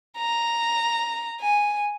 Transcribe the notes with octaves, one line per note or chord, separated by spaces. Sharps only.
A#5
G#5